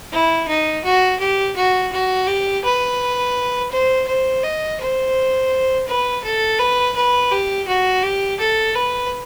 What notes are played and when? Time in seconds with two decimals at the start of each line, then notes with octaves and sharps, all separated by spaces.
0.12 E4
0.48 D#4
0.84 F#4
1.20 G4
1.56 F#4
1.92 F#4
2.28 G4
2.64 B4
3.72 C5
4.07 C5
4.43 D#5
4.80 C5
5.88 B4
6.24 A4
6.59 B4
6.96 B4
7.31 G4
7.68 F#4
8.03 G4
8.40 A4
8.75 B4